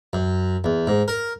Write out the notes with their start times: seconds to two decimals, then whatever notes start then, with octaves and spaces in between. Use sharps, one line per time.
0.13 F#2
0.64 E2
0.87 G#2
1.08 A#4